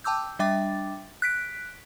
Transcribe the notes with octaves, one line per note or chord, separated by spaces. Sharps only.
G5 A5 D6 E6 G6
G3 D4 E5 G5 D6 A6
F#6 B6 D7